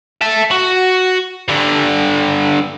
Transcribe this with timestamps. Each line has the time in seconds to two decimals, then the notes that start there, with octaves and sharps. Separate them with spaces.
0.21 E5 A5
0.51 F#4
1.48 G2 D3